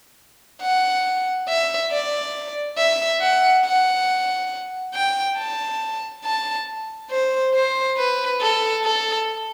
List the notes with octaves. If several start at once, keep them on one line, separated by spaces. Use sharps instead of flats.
F#5
E5
D5
E5
F#5
F#5
G5
A5
A5
C5
C5
B4
A4
A4